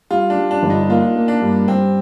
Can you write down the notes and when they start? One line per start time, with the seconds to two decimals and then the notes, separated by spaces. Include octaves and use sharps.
0.10 G3 F4
0.30 D4
0.37 G3
0.51 D4
0.63 G1
0.70 D#4
0.89 A#3 F4
1.15 A#3
1.28 D4
1.42 G2
1.68 G2 C4